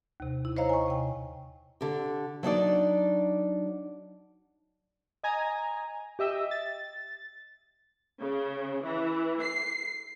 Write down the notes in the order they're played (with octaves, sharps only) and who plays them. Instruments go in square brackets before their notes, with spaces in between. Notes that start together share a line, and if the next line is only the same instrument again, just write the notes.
[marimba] D#2 C3
E4
C5 C#5 D#5 F5 A#5
G#5 C#6
C3 G5
[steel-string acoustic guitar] D3 G4
F#3 D4 D#4 D5
[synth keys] D#5 G#5 A#5
G4 D#5 E5 G5
A6
[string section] C#3
E3
C7